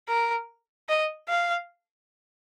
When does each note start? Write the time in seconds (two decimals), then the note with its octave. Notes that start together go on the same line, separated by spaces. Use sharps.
0.08 A#4
0.89 D#5
1.29 F5